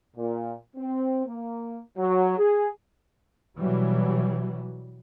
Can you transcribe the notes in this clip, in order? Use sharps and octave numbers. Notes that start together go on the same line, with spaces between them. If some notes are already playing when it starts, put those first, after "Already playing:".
A#2
C4
A#3
F#3
G#4
B2 E3 F#3 G3